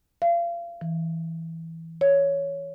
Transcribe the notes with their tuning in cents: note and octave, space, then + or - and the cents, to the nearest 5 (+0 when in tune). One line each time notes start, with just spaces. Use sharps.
F5 -30
E3 -10
C#5 +10